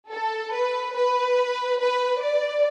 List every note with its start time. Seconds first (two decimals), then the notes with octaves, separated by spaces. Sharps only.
0.11 A4
0.52 B4
0.95 B4
1.80 B4
2.22 D5